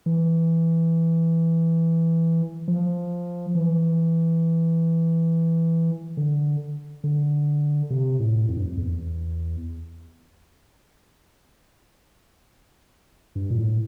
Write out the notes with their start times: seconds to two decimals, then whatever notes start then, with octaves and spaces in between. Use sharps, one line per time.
0.06 E3
2.68 F3
3.55 E3
6.17 D3
7.04 D3
7.90 C3
8.19 A2
8.48 F2
8.57 G2
8.65 F2
8.78 E2
13.35 G2
13.50 A#2
13.58 A2